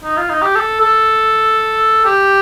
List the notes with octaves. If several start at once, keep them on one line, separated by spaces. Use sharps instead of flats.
D#4
F4
D#4
G4
A4
A4
G4